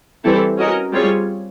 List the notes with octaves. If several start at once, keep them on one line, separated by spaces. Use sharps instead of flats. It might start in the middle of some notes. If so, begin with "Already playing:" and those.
E3 G3 C4 E4 A4
C#4 F#4 A#4 D#5
G3 C4 F4 G#4 C#5